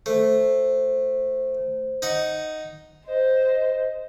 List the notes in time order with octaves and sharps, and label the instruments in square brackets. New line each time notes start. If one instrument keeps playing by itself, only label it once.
[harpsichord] A3 [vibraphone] C5
[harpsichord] D#4 F#5
[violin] C5 [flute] D#5